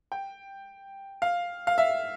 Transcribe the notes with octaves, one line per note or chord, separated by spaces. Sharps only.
G5
F5
F5
E5